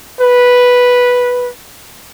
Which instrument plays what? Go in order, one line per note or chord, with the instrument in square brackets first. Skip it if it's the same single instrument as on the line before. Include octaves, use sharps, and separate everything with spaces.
[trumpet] B4